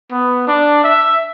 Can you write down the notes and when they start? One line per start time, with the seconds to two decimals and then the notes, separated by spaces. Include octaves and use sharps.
0.12 B3
0.47 D4
0.84 E5